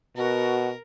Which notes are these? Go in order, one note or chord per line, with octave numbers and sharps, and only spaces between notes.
B2 F#4 A#4